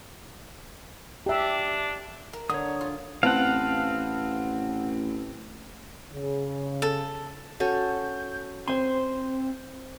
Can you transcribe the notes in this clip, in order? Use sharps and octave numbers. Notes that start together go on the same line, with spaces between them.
D4 G4 E5
A#4
D3 C#5 D#6
F4
A1 C4 B4 F5 F#5 A5
C#3
A4
C#4 F#4 A4 G6
C4 C5 G#5 C6